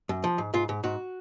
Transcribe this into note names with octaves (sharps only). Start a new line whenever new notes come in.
F#2
F3
G#2
G#2 F4
G#2
G#2 F#4